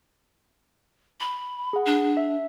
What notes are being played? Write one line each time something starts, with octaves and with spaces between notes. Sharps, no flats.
B5
G#4 F#5
D4
E5